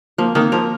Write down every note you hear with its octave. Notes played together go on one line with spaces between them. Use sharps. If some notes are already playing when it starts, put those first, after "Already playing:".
F3 A#3
D#3 A#3
F3 A#4